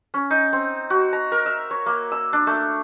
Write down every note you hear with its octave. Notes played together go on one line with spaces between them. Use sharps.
C#4
D#4
C4
F#4
A#5
A#4
E5
C#5
A#3
E6
D4
A3